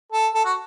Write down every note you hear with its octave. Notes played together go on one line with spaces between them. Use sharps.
A4
A4
F#4